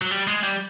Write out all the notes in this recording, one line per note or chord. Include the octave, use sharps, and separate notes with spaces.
F#3
G3
G#3
G3